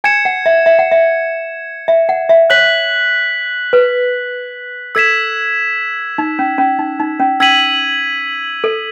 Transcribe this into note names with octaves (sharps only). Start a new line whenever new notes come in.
G#5 G#6 C#7 E7
F#5
E5
E5
F#5
E5
E5
F#5
E5
C#5 F#6 B6 F#7
B4
A4 E6 G#6 B6 E7
D#4
C#4
C#4
D#4
D#4
C#4
C#4 E6 G#6 B6 D#7 F#7
A4